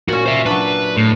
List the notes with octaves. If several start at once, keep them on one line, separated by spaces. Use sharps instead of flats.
A#2 C#4 F#4
C5 E5
F#3 D4 B4
A2